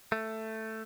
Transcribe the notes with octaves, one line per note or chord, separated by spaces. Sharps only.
A3